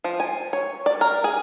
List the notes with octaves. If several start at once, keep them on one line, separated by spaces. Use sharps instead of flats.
F3
G#5
C#5
D5
A#4
G#4